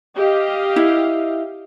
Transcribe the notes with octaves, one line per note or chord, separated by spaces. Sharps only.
G4 D#5 F5
E4